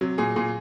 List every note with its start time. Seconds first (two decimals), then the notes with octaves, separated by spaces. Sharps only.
0.01 C3 F#3
0.18 A#2 G#4
0.36 A#2 G#4